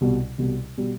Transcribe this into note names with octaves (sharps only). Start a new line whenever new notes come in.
C2 B2 G3
C2 B2 G3
B2 G3